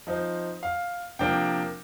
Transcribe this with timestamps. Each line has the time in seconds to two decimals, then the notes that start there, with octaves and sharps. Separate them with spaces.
0.07 F3 C4 D#4
0.63 F5
1.19 C3 F3 A#3 D4 G5